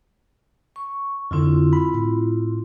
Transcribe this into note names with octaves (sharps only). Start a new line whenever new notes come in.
C#6
F2 D3 C4 E4 F4
B5
A2